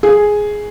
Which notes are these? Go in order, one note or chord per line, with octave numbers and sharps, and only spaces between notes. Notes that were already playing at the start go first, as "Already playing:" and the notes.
G#4